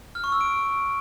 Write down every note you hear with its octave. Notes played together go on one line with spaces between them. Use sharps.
F6
C#6
E6
D7